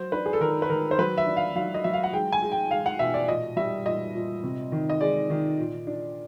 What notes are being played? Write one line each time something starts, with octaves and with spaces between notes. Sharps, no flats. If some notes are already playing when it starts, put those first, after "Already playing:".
Already playing: F#3 C5
D4 B4
G#4
A4
D#3 A#4
B4
D#3 A#4
C5
F#3 B4
E5
D4
F5
F#3 F5
D#5
F#3 E5
F5
F#5
G#3 G5
G#5
G#3
G5
G#3 F5
F#5
B2 E5
D5
A#2 D#5
G3 E5
A#2 D#5
A#2
C3
D#3
D#5
G#3 D5
D#3
A#2
D4